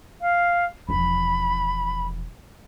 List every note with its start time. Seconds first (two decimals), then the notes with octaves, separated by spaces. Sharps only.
0.21 F5
0.89 E1 F3 B5